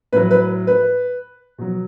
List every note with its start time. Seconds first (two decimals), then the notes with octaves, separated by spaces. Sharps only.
0.12 A2 B4
0.16 F#3
0.31 B4
0.67 B4
1.58 B2 F#3